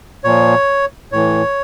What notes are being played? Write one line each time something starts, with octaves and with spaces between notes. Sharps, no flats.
A#2 F3 C#5
A2 E3 C#5